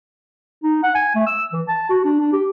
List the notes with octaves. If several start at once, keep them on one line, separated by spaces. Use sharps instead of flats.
D#4
F#5
G#5
A3
E6
E3
A5
F#4
D4
D4
G4